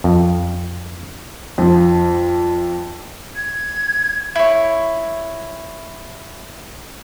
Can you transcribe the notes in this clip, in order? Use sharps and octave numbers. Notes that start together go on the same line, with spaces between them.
F2
F2 F3
G#6
E4 C#5